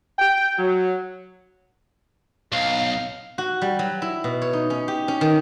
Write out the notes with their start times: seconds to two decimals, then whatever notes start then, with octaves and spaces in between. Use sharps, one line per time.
0.19 G5
0.58 F#3
2.52 B1 F5
3.38 F#4
3.62 G3
3.79 F#3
4.02 E4
4.24 B2
4.42 C#5
4.53 D#4
4.70 C#4
4.88 G4
5.08 C#4
5.21 D#3